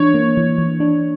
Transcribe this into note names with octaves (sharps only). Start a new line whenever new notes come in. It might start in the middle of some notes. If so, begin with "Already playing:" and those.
Already playing: E3 D4 C#5
A#3
E3
E3
D4